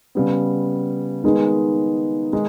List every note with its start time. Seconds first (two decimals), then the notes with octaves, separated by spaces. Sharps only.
0.15 C#3 G3 B3
1.24 D#3 G#3 B3 D#4 G#4
2.33 D#3 G#3 D#4